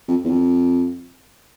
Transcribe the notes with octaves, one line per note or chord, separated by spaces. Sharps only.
F2
E2
F2